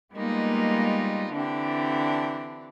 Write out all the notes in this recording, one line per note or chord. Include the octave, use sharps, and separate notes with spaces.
G3 G#3 A#3 B3 D#4 F4
D3 E3 C4 D4 G4